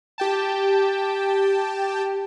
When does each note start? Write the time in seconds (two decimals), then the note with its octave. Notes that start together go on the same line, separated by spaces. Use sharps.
0.18 G4 G5 A5